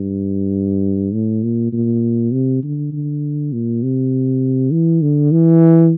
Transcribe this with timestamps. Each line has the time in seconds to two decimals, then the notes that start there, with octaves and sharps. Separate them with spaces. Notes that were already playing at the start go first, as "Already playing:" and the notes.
Already playing: G2
1.13 A2
1.43 A#2
1.72 A#2
2.32 C3
2.63 D3
2.92 D3
3.52 A#2
3.83 C3
4.72 E3
5.02 D3
5.32 E3